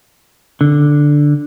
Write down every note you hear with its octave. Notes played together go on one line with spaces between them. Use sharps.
D3